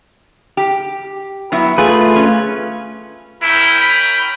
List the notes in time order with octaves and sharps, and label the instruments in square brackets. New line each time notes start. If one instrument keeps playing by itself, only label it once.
[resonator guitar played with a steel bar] G4
F#3 B3 E4
[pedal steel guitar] A3 F4 B4 [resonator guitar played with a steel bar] G#4
[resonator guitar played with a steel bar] C#4
[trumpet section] C#4 A#4 G5 [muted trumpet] E4
[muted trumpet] B5